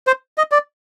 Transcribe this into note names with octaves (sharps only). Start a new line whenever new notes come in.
C5
D#5
D5